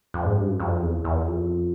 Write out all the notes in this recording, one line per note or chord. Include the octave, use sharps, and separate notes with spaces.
F2
G#2
G2
F#2
F2
E2
E2
F2